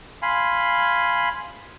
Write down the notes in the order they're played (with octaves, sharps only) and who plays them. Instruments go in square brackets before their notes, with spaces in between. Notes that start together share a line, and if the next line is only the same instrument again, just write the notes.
[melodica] F5 G#5 B5 C6